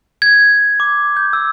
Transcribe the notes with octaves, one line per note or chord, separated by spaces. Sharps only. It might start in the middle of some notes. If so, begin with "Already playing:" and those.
G#6
D6
G6
E6